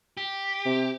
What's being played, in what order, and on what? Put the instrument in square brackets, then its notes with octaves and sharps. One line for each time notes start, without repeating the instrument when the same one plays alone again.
[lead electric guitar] G4
[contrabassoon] C3